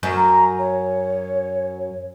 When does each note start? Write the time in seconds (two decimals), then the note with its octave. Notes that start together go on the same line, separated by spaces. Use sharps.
0.03 F#2
0.15 A#5
0.58 C#5